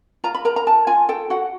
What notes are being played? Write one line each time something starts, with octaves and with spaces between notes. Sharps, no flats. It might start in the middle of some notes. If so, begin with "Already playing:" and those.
F4 A#5
B5
A#4 A#5
A#5
A#4 A5
F4 G#5
A4 G5
F#4 F#5